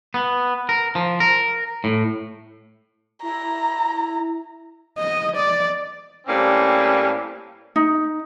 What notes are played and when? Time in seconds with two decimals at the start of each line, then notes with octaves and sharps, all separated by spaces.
0.14 B3
0.69 A#4
0.95 F3
1.20 A#4
1.84 A2
3.23 E4 A#5
4.99 D#5
5.36 D5
6.27 A2 G3 A#3 C4 C#4
7.76 D#4